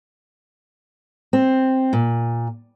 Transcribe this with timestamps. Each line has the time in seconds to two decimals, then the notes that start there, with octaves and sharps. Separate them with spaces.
1.33 C4
1.93 A#2